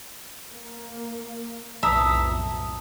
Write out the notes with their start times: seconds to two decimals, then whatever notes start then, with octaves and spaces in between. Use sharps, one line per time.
0.52 A#3
1.83 B1 F2 A2 E5 A5 A#5 D#6